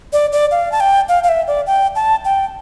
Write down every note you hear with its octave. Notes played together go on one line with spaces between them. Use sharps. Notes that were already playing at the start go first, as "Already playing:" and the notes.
D5
D5
F5
A5
G5
F5
F5
E5
D5
G5
A5
G5